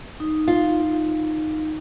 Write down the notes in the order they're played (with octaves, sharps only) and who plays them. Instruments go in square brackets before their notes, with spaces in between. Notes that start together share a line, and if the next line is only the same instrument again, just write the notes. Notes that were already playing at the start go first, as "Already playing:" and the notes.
[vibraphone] D#4
[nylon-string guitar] F4